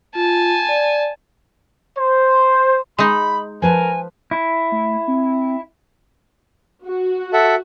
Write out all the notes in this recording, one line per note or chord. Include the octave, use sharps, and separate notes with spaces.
F4 G#5 A5
D5
C5
G#3 D#4 B5
F3 A#4 B4 G#5 A5
E4
A3
C4
F#4
A4 E5 F#5